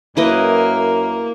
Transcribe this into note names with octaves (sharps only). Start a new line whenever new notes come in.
F#2 A#3 E4 B4 D#5